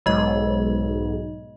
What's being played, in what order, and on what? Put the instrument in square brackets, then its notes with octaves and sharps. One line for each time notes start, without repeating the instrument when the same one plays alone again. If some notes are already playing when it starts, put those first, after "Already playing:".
[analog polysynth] B1 G#2 [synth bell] G#3 D#5